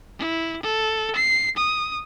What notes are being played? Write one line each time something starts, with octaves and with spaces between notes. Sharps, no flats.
E4
A4
C7
D#6